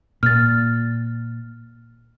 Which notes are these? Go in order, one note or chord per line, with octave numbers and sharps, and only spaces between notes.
A#2 F6 A6